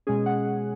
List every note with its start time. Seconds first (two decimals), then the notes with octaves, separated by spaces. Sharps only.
0.07 B2 G#3 C#4 G#4
0.26 F#5